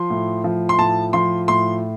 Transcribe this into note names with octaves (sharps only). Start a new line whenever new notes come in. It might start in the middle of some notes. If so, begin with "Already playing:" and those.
Already playing: F3 C6
A2
F3
C6
A2 A5
F3 C6
A2 C6